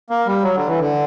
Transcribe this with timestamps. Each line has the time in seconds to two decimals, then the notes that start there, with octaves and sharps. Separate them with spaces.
0.10 A#3
0.26 G3
0.43 F#3
0.56 D3
0.67 E3
0.80 D3